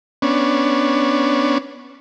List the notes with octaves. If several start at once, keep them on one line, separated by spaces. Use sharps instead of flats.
B3 C#4 D4